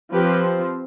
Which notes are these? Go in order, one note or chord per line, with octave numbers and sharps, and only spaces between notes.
F3 C4 G4 B4